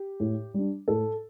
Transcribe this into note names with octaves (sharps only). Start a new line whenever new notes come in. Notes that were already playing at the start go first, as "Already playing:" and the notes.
Already playing: G4
A2
G3 D4
A2 A4